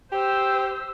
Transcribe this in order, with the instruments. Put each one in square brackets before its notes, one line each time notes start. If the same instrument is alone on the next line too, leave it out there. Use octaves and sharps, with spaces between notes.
[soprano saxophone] G4 [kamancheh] C5 E6